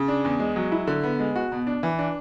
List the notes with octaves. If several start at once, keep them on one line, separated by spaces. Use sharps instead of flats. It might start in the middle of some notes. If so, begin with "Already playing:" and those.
Already playing: C#3
D4
E2
G#3
F#3
E4
D3
B3
G#3
F#4
B2
D4
E3
D4